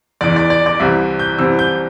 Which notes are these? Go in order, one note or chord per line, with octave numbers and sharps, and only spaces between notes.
E2 E3 D5
D5
D5
D5
C2 C3 E3 E5
G6
C2 C3 E3 E6
G6